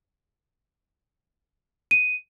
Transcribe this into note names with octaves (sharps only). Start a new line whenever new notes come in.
D#7